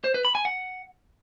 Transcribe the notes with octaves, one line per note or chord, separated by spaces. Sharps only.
C5
B4
B5
G#5
F#5